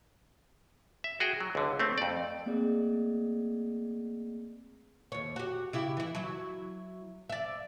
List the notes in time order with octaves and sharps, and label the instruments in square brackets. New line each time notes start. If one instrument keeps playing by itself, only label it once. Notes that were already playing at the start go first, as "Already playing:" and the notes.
[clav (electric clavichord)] E5
F#4 G#4 G5
F#3
C#2 D3
A3 C4
F2 D5
[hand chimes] A3 A#3 C4 G#4 D5 D#5
[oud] D#2 C#5
F#4 G4
C#3 E4 G4
E3 E4
F#3 E4
D5 E5